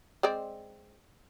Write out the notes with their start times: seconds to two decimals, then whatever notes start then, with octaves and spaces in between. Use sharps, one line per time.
0.23 G#3 C4 D5